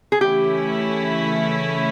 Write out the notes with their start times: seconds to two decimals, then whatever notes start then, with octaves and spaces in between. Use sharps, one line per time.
0.12 G#4
0.20 C#3 E3 A3 C#4 E4 G4